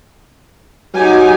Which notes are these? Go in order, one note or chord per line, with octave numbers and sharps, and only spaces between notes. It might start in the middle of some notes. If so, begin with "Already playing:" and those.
F#3 D#4 G4 G#5